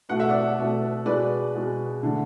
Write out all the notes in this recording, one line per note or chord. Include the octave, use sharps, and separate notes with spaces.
B2 A3 F#5
E5
D5 F#5
B2 A3
B2 G#3 B4 D5
B2 G#3
D3 A3